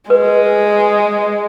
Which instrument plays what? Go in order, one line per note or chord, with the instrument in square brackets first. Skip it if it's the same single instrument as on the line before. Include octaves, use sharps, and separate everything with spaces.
[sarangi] G#3 [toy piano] B4